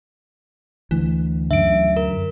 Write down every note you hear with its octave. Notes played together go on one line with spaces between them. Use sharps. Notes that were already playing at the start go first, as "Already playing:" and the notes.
D2 E3
F#2 D3 E5 D7
A#4